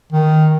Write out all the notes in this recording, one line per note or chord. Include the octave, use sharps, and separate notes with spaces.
D#3